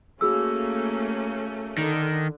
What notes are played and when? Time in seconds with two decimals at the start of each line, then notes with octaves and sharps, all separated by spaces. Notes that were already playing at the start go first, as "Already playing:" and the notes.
0.21 A3 A#3 C#4 F#4 G#4 E6
1.78 D3 D#3